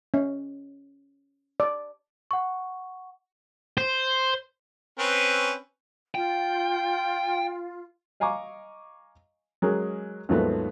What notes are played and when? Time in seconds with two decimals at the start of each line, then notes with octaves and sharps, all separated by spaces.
0.14 C#4
1.60 D5
2.31 F#5 C#6
3.78 C5
4.99 C4 C#4 B4
6.15 F4 G5
8.20 D#5 F5 G#5 A#5 C#6 D6
9.62 F#3 G#3 C#4 G#4 A#4
10.29 D#2 G#2 F3 F#3 A3 B3